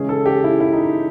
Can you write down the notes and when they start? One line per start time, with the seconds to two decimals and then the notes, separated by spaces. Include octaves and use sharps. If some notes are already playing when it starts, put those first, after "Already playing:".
Already playing: C#3 E3 G#3 C#4 G#4
0.09 A4
0.26 G4
0.44 E4
0.60 E4
0.73 D#4